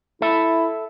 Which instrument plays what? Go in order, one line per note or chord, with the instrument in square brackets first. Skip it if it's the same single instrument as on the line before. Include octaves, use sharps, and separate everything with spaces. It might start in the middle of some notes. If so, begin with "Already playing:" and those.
[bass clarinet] E4 [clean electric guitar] A4 E5